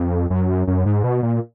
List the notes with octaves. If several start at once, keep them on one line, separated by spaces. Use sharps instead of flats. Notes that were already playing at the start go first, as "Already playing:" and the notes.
Already playing: F2
F#2
F#2
G#2
B2
A#2